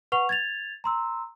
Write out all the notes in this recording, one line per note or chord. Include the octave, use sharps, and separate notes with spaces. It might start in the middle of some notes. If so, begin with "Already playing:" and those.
B4 F#5 C#6 F7
G#6 A6 F7
A#5 C6 E6